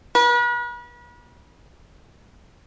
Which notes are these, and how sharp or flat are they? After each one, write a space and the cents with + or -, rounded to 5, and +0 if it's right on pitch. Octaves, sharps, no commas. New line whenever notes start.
B4 -40